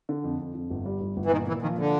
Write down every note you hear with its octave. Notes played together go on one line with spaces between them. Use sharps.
D3
F2
F2
F2
G1
G3
G1
G1
E3
A#2 D#3
A#2 E3
D#3 F3
D3 F3